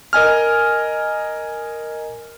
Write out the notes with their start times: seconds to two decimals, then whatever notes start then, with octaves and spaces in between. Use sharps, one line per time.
0.13 A#4 D#5 G#5 F6